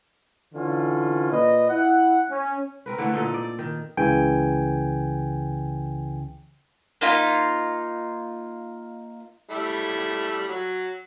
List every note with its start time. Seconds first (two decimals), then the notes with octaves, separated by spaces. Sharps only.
0.54 D3 E3 C#4 F4
1.32 A#2 B4 D#5
1.69 E4 F#5
2.30 C#4
2.86 C4 A#4 B4
2.98 D3 E3 A3
3.14 A#2 D#4 A4
3.34 D5
3.59 D#3
3.97 C#2 C#3 E3 G5 G#5
7.01 A#3 D#4 F4 B5
9.50 G3 A3 E4
10.48 F#3